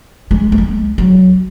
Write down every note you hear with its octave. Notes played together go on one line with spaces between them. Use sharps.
G#3
A3
G#3
F#3